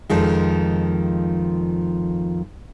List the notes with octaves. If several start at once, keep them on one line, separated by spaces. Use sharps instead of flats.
F2 D#3 F3 G#3